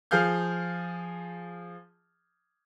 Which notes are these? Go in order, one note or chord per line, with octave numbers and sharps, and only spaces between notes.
F3 G#4 F5 F6 G6